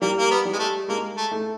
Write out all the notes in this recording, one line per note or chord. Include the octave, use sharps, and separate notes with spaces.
G3 A#3
A#3
B3
G3
G#3
A3
G#3 A#3
A3
A3